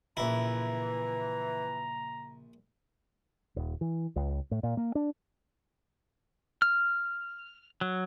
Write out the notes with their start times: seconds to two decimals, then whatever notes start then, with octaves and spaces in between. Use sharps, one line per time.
0.17 A#1 A#2 C#3 E3 E4 A#5
3.56 D#1
3.81 E3
4.16 C#2
4.51 A2
4.63 A#2
4.77 A#3
4.95 D4
6.62 F6
7.81 F#3